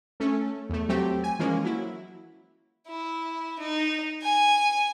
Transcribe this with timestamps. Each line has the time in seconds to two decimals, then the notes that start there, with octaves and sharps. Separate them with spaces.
0.20 A3 C#4 A4
0.69 E2 A3
0.88 F#3 A3 C4 G4
1.24 G#5
1.39 E3 F3 G#3 A#3 C#4
1.64 F#3 E4
2.88 E4
3.59 D#4
4.22 G#5